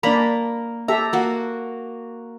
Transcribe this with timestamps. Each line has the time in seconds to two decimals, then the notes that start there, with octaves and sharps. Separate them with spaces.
0.03 A#3 D4 D5 A#5 B5
0.88 G4 A4 E5 A#5
1.13 A#3 F#4